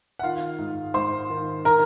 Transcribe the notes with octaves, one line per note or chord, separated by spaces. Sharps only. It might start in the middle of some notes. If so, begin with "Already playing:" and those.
F#5
D#3 F4 F5
G#2
G#2 C5 C6
D#3
D#3 A#4 A#5